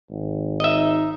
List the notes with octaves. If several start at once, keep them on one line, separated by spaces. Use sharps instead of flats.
G#1
D#4 D#5 E5